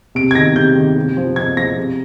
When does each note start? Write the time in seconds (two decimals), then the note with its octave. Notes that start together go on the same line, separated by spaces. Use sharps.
0.15 C3 D7
0.31 G#6
0.35 D#3 A#6
0.56 C3 G6
0.76 D#3
0.96 C3
1.17 F3
1.36 C3 G#6
1.57 F3 A#6
1.77 C3